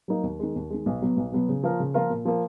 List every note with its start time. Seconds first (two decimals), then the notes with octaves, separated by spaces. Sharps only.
0.08 F#3 A#3 D#4
0.23 D#2
0.39 D#3 G#3
0.56 D#2
0.70 D#3 G#3
0.86 B1
1.01 B2 F#3 B3
1.17 B1
1.32 B2 F#3 B3
1.49 C#3
1.63 F3 A#3 F4 A#4
1.80 C#3
1.94 F3 A#3 F4 A#4
2.10 A#2
2.25 F3 A#3